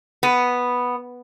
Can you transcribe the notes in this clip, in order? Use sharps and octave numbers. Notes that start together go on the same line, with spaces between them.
B3